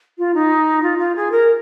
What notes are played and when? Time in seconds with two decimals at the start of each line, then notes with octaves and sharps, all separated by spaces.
0.18 F4
0.34 D#4
0.83 F4
0.98 F4
1.15 G#4
1.31 A#4